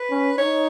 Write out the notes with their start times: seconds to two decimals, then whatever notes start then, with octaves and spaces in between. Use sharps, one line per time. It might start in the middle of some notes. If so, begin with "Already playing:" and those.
Already playing: B4
0.10 C#4
0.38 D#4 C#5